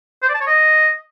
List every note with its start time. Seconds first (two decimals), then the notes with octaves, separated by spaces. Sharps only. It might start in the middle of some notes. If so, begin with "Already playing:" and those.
0.23 C5
0.29 D5
0.35 A5
0.41 C#5
0.47 D#5